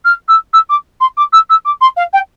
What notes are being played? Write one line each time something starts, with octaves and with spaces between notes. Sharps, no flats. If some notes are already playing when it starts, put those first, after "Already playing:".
F6
E6
E6
D6
C6
D6
E6
E6
D6
C6
F5
G5